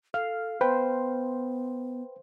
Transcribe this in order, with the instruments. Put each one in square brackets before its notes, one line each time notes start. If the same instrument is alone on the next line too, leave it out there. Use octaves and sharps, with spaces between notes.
[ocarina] A4 [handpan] F5 [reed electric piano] F6
[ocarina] B3 [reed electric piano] B4 G5 [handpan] C5